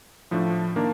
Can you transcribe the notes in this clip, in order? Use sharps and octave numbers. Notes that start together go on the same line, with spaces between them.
A2 F3 A3 D4
D#3 A#3 D4